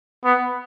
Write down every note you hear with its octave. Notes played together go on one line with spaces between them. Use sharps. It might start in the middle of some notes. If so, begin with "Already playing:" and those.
B3